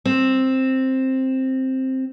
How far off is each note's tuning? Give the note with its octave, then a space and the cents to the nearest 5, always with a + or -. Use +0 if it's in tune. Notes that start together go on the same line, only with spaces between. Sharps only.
C4 +5